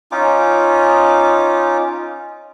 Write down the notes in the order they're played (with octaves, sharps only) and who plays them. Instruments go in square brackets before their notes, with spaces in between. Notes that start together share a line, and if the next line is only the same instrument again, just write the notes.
[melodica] C#4 D#4 F4 D6